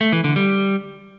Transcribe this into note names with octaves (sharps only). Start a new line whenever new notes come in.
A3
E3
D3
G3